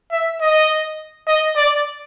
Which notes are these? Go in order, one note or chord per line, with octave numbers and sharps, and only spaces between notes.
E5
D#5
D#5
D5